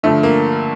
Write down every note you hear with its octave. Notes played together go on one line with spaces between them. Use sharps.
G2 D3 F3 A3
A#3